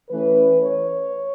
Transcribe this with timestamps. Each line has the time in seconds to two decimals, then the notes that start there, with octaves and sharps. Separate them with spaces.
0.10 E3 A3 C#4 B4
0.61 C#5